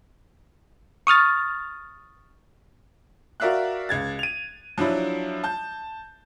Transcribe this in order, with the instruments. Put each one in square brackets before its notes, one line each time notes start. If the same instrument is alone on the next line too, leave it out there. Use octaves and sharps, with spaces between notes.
[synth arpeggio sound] C#6 D#6 F6 A6
[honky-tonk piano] F#4 A#4 D5 E5 F5 F#6
C#2 G#6 A6
D#7 F7
F3 F#3 D4 E4
A5 G6